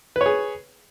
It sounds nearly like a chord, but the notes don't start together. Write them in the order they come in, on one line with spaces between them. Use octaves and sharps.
B4 C#5 G#4